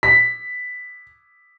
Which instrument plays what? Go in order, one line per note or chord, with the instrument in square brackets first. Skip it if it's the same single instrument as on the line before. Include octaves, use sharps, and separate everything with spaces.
[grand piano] B6